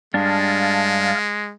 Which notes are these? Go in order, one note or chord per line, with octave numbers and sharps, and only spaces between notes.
G2 G#3 D4 F5 A5